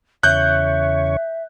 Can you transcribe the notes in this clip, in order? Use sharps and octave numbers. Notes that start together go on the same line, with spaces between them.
E2 C#3 C#5 E5 F#6 G6